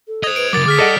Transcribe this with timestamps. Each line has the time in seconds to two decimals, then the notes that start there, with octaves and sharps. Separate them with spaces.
0.07 A4
0.23 C5 D#5 D#6 G#6 F7
0.36 B4 D7
0.53 C#3 F#3 A#4 D6 A6
0.66 D2 G#4 D6 F6 B6
0.79 G3 A4 D5 D#5 F#5